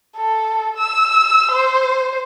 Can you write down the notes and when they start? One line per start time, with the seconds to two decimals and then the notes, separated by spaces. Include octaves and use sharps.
0.17 A4
0.78 E6
1.52 C5